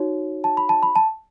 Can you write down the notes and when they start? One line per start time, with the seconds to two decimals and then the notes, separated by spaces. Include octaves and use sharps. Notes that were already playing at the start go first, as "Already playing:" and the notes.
Already playing: D#4 F#4 C#5
0.44 A5
0.57 B5
0.69 A5
0.83 B5
0.96 A5